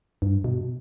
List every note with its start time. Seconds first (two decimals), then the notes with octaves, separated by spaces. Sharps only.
0.22 G2
0.44 B2